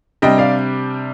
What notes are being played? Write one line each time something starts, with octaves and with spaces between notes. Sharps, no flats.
C3 G3 D4 D#5 G5
D5 F5